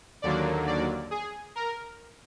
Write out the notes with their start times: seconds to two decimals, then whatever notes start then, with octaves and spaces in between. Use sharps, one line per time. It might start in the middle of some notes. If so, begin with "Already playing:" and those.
0.22 D#2 D3 F#3 A#3 D5
0.67 D5
1.11 G#4
1.56 A#4